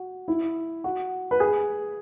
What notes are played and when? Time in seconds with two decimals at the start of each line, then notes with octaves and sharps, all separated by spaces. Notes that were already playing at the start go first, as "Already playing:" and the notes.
Already playing: F#4
0.28 E4
0.84 F#4
1.31 B4
1.40 G#4